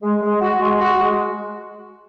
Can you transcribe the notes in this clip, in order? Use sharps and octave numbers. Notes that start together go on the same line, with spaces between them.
G#3
G#3
F#4
G#3
F#4
G#3